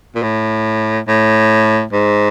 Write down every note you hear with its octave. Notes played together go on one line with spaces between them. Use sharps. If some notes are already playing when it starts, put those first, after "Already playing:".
A#2
A2
A2
G#2